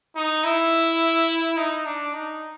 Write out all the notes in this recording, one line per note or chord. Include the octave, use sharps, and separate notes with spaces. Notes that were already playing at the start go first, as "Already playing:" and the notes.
D#4
E4
D#4
D4
D#4